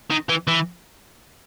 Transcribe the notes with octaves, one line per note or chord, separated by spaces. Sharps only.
D#3
E3
E3